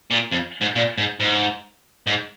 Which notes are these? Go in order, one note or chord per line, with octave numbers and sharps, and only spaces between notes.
A#2
F2
G#2
A#2
G#2
G#2
G#2